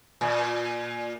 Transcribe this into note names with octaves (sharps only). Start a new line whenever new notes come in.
A#2